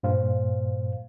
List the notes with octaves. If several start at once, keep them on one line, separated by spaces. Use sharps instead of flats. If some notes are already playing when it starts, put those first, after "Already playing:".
G2 A#2 C5 F5